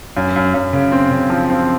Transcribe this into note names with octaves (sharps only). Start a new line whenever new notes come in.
F#2
F#2
F#2
C#3
C4
C#3
F3
C4